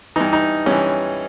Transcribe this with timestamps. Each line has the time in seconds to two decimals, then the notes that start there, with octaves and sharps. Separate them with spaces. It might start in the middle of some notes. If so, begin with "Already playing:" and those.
0.16 G2 E3 D#4
0.33 D#4
0.66 G2 E3 C#4